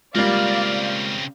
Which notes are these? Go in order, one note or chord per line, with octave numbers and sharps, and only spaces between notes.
C#3 G3 G#3 A#3 C4 F4 D5 F5